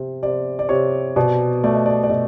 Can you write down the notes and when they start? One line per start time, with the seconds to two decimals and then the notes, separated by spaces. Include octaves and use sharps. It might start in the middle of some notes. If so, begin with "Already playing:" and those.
Already playing: C3
0.23 C3 D5
0.59 D5
0.69 C3 C#5
1.16 B2 D5
1.64 A3 D5
1.75 D#5
1.86 D5
2.04 D5
2.10 B2 D#5